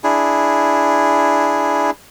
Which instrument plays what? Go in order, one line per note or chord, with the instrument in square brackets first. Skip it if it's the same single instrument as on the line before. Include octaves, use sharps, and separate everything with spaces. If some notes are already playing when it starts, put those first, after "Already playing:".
[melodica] D4 E4 G#4